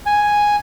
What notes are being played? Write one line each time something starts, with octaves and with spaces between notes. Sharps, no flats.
G#5